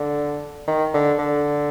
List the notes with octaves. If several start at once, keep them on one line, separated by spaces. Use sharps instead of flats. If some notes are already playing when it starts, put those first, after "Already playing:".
Already playing: D3
D#3
D3
D3